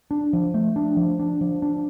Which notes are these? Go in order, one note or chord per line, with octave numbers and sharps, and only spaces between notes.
D4
F3
A3
D4
F3
D4
F3
D4